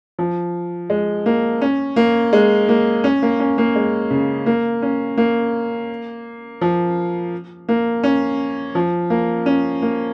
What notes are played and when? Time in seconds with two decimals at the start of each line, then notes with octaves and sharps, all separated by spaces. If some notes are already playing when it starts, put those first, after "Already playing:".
0.19 F3
0.90 G#3
1.26 A#3
1.62 C#4
1.96 A#3
2.33 G#3
2.69 A#3
3.04 C#4
3.22 A#3
3.40 C#4
3.58 A#3
3.76 G#3
4.10 C#3
4.46 A#3
4.82 C#4
5.18 A#3
6.61 F3
7.69 A#3
8.04 C#4
8.75 F3
9.10 A#3
9.46 C#4
9.82 A#3